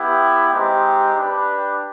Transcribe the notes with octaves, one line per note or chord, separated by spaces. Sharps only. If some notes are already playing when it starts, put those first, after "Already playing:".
Already playing: B3 E4 G4
G#3 C4 D#4 G4
D4 G4 B4